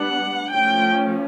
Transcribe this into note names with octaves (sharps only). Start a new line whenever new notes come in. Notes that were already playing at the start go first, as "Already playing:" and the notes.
Already playing: G3 B3 D4 F#5
F3 A3 C#4 G5